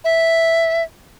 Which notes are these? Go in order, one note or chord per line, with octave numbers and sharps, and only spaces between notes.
E5